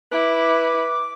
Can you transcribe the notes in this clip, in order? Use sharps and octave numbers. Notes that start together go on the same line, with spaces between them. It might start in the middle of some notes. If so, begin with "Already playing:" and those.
E4 B4 D6